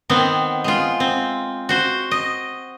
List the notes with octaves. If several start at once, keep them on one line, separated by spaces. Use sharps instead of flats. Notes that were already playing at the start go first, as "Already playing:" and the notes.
D#3 B3 C4
G#3 F4
C4
F#4 C5
D#5